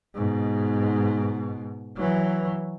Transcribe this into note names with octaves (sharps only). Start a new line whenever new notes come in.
G#2 B2
E3 F#3